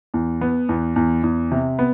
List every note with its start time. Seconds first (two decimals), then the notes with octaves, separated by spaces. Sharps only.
0.14 E2
0.41 B3
0.69 E2
0.96 E2
1.23 E2
1.51 C3
1.79 B3